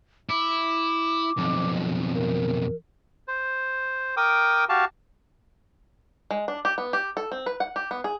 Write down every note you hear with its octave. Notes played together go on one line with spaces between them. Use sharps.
E4 D6
B1 F2
A#4
C5
A#4 G5 D6 D#6
F#4 G4 F5 A5
G#3
D4
G4
B3
G4
A4
C4
B4
F#5
G4
B3
G#4